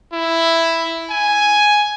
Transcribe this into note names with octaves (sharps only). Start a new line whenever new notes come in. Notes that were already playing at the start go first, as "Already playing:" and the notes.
E4
G#5